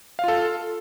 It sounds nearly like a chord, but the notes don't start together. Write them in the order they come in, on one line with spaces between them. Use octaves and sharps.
F5 F4 A4